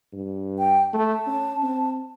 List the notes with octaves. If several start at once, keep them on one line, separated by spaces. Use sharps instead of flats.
G2
G5
A3 A5
C#4
C4